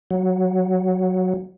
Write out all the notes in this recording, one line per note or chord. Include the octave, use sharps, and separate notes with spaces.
F#3